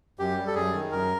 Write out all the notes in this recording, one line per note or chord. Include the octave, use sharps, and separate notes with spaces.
F#2 G4
G3
A4
F#2 G#4
D#3
F#2 A#4